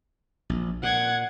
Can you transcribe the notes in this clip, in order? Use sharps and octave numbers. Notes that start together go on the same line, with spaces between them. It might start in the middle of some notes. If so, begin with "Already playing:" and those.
A#1
A#2 F#5 G#6